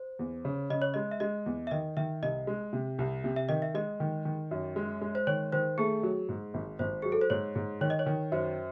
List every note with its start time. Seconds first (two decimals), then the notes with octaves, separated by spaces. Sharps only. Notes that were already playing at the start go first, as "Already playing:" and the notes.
Already playing: C5
0.19 E2
0.45 C#3
0.70 C#3 D#5
0.82 C#5
0.94 G#3 D#5
1.11 E5
1.20 G#3 D#5
1.46 E2
1.67 E5
1.71 D#3 D#5
1.97 D#3 E5
2.22 C2 D#5
2.47 G#3
2.73 C3
2.99 C2
3.24 C3
3.36 E5
3.49 D#3 D#5
3.62 E5
3.74 G#3 D#5
4.00 D#3
4.25 D#3
4.51 F#2
4.76 G#3
5.02 G#3
5.15 C5
5.27 D#3 C#5
5.52 D#3 C5
5.78 A3 G#4
6.03 F#3
6.29 G#2
6.54 G#1
6.79 G#1 C5
7.02 F#3 G#4
7.12 A4
7.21 C5
7.30 G#2 C#5
7.55 G#2
7.81 D#3 C#5
7.90 D#5
7.99 C#5
8.06 D#3
8.32 F#2 C5